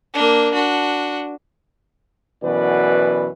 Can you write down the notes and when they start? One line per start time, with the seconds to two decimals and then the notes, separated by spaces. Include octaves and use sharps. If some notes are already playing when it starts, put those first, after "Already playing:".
0.14 A#3 D4
0.54 D4 F#4
2.44 F#2 B2 E3 B4 D5